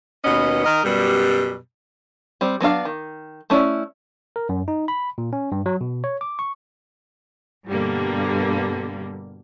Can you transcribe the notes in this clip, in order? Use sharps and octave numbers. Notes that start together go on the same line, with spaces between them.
D#2 B2 B3 C#4 D#5
D#3 A#4 D#5
F#2 B2 G3
G3 C4
F#3 B3 D4 F5
D#3
A3 C#4 E4 D5
A#4
F#2
D#4
B5
A#2
C#4
G2
F#3
B2
C#5
D6
C#6
G2 B2 D3 G3 A#3